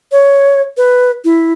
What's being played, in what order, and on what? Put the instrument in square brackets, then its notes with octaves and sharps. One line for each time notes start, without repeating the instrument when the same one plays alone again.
[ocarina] C#5
B4
E4